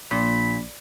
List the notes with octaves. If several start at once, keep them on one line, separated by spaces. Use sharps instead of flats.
A#1 A#2 B5